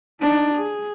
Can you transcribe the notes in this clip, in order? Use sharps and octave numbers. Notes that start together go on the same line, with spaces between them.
D4 D#4
G#4